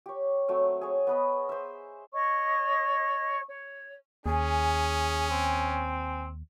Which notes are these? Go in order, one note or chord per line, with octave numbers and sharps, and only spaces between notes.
G4 C#5
F#3 A3 C4
G#4 C#5
B3 B4 D#5
C5 E5
C#5 D#5 C#6
C#5
D#2 C#4 G#4 G#5
C4